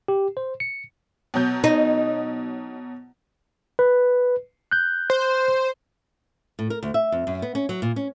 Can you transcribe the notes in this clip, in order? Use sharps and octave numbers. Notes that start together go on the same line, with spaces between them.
G4
C5
C#7
B2 F#3 G6
D#4
B4
F#6 G6
C5
A2
A#4
D2
E5
F2
F#2
B3
C#4
F#3
A#2
C#4